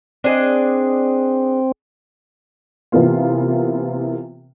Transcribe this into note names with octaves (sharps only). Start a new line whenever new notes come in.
C4 D4 G#4 D#5
C3 E3 A#3 B3 F4